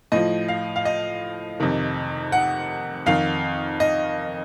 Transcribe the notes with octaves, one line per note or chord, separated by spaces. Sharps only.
A2 F3 D#5
F5
F5
D#5
F2 C3 D#3
F#5
F2 D#3 F5
D#5